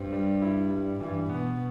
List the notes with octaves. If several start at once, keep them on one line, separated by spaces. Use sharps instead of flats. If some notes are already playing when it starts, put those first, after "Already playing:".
Already playing: G2 C4
G3
E4
G3
G2 E3
B2 B3